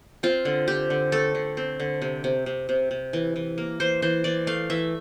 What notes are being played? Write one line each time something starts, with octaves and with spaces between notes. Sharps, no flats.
C4 F4
D3
C4 G4
D3
A3 A4
D3
C4
D3
C3
C3
C3
C3
C3
E3
E3
A#3
E3 C5
E3 C5
E3 D5
A3 F5
E3 E5